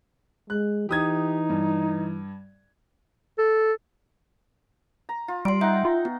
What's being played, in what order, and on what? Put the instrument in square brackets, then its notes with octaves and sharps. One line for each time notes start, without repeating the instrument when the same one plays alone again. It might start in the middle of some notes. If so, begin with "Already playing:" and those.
[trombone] G#3 [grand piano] F#6
[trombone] E3 [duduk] D#4 [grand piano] G4 D#6 G#6
[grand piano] G2
[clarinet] A4
[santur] A#5
F4
[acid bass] G3 [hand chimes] C6 D7
[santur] D#4 F#5 G5 [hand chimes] E5
[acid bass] F4
[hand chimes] B3